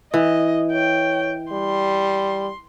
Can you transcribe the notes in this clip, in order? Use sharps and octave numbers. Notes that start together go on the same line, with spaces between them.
E3 D#5
C#5 G5
G3 C6